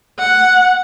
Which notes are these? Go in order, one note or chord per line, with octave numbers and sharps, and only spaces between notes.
F#5